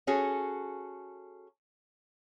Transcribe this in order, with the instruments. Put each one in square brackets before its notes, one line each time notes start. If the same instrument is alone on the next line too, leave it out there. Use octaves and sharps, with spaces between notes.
[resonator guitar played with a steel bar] C#4 F#4 G#4 A4